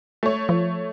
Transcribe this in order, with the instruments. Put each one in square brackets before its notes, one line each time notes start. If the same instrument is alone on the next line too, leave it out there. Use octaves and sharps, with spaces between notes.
[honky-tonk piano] A3 C#5
[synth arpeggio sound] F3